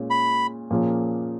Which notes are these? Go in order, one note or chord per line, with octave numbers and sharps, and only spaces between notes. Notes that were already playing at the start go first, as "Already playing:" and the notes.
Already playing: A#2 G#3 C#4
B5
A#2 F3 A#3 C#4 G#4